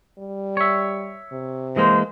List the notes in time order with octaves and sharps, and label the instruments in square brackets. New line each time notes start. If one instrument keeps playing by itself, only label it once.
[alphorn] G3
[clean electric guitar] C#5 E5
[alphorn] C3
[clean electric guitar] E3 G#3 A#3 [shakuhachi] C5